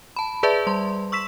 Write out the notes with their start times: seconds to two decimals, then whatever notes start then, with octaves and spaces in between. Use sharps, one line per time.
0.16 A5 B5
0.43 G#4 B4 D5 E5 A5
0.67 G3 C6
1.12 C#6 E6 B6 E7